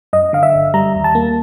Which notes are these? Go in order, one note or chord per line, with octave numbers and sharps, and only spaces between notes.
F#2 D#5
D3 F5
E5
G1
G3 A#5
D#2
A5
A#3